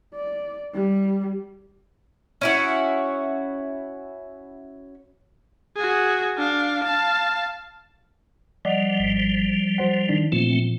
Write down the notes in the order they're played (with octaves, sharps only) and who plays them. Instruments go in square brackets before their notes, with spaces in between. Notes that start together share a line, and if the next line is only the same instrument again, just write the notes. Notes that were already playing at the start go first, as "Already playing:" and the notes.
[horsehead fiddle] D5
G3
[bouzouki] C#4 E4 F#4
[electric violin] F#4 G#4
D4 F5
F5 A5
[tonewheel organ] F3 G3 [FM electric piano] D5 D#5 F#5
[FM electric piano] G#1
F#3 C5 F#5
D#3 D4
[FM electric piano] A#2 E3 F3 [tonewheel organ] A3 C4